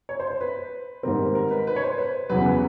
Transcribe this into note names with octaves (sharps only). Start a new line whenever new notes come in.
C#5
C5
C5
B4
G#2 D#3 G3 C4 A#4
A#4
B4
B4
C#5
C5
B4
E2 C#3 F#3 B4
B4